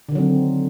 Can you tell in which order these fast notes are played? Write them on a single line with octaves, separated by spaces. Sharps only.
D3 D#3 F#3 C4